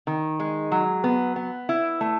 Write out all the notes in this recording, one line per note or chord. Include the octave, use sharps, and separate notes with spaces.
D#3
G#3
F#3
B3
B3
E4
A3